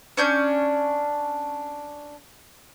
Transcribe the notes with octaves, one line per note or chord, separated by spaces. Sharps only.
C#4 D4 G6